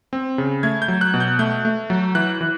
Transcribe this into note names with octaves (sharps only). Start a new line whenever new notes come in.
C4
C#3
A3 G#6
G6
F#3
F#6
B2
G6
A3 G6
A3
F#3
E3 F#6
E3